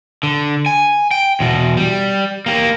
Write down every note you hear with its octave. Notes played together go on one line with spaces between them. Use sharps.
D3
G#5
G5
E2 B2
G3
A#3 G4